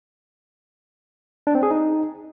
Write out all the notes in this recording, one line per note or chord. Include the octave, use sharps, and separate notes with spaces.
D4
C4
G#4
D#4